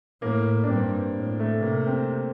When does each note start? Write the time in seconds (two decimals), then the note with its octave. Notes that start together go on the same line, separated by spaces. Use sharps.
0.22 A2 A#3
0.64 D4
0.69 G2 C4
1.17 A2
1.40 A3
1.62 C3 A#3
1.87 C4